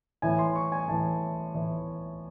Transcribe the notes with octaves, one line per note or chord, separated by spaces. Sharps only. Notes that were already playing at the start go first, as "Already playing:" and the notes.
A2 E3 G#5
C6
C#6
G#5
A2 E3 A5
A2 E3